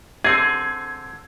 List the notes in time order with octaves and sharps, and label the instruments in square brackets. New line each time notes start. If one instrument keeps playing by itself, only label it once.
[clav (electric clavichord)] D3 C4 G#4 [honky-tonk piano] G#6 C7